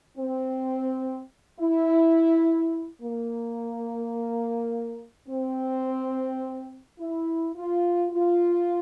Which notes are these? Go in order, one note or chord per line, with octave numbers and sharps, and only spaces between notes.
C4
E4
A#3
C4
E4
F4
F4